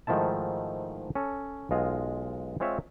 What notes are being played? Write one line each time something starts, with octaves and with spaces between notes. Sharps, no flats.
G#2 D#3 F3 A3 E4 A5
C#4 A4
B1 G#3 F4 D#5 F5
G#3 C4 F4 C#5 E5